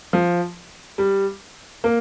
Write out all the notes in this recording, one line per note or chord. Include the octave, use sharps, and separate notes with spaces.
F3
G3
A#3